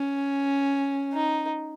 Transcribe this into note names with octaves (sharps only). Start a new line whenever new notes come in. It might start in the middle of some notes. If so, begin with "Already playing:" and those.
Already playing: C#4
D#4